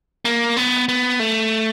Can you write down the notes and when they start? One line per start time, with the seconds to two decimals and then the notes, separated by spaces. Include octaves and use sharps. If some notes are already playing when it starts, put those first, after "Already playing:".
0.25 A#3
0.57 B3
0.88 B3
1.20 A3